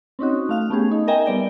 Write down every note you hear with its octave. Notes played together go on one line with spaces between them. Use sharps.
C4 C#4 D#4 F#4
A3 F5 F7
A3 B3 C#4 G4 G#4
D#4
A#4 D#5 E5 G5 G#5 A#5
G3 B3 D5 G5